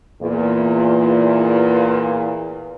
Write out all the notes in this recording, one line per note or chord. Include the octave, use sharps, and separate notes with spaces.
E2 A#2